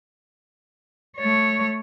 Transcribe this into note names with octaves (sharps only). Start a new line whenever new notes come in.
A3 C#5